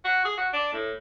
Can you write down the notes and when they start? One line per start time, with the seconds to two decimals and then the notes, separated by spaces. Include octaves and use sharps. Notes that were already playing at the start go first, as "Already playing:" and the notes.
0.04 F#4
0.25 G#4
0.37 F#4
0.53 D4
0.73 A2